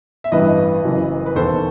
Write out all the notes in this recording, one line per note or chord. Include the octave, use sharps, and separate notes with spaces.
E5
A1 G2 E3 B4 D#5
F#1 F#2 E3
B4
E1 D#2 D#3 A4 C5